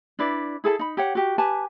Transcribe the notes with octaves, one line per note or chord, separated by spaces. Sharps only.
D4 E4 B4 D5
E4 G#4 A4 A5
D#4 B5
G4 C#5 F#5
F#4 G4
G4 B4 G#5 A5